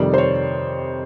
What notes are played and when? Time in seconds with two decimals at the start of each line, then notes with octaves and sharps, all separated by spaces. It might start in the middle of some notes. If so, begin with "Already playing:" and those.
Already playing: F2 C3 D#3 G3 D5
0.14 C5
0.18 C#5